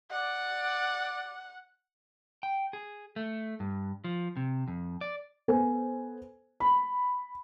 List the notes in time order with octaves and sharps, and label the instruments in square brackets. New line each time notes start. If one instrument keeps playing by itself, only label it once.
[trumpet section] D5 [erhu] F#5
[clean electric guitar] G5
G#4
A3
G2
F3
C3
F2
D5
[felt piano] B3 A4 C5 G#5
B5